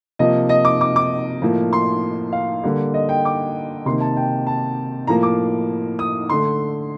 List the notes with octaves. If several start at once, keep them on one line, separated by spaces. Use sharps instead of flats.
C3 F3 A#3 D#5
D#5
D6
D6
D6
A2 F3 A#3
C6
F5
D3 G3 A#3
D#5
G5
D6
C3 D#3 A#3 C6
A5
G5
A5
A2 F3 A#3 A#5
D6
D#6
D3 A3 C6